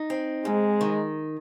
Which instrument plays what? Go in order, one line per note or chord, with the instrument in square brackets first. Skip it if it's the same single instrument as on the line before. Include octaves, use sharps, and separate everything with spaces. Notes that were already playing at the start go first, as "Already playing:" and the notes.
Already playing: [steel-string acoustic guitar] D#4
C4
[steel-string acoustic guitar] G#2 [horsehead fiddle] G#3
[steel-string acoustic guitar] D#3